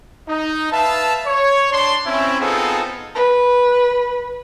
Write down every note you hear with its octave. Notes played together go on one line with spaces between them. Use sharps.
D#4
B4 E5 F5 A5
C#5
D4 A5 C6
C4 C#4 E4
B3 C4 D#4 F4 G#4 A4
B4